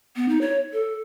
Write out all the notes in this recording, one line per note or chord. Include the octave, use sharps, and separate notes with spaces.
B3
D#4
C#5
A4